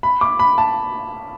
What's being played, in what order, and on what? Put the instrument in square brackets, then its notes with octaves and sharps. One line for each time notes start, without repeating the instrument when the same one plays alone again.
[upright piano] B5
D6
B5
A5